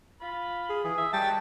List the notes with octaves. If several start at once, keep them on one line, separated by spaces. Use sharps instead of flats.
F4 B5
G#4
E3 G#4
E5
D#3 F#3 G3 G5 A5